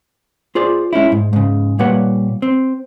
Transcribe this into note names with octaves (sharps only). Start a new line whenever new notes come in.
F4 G#4 C5 D5
G#3 C#4 D#4 E4
G#2
G#2 C#3
A#2 G3 A#3 B4 C#5 F#5
C4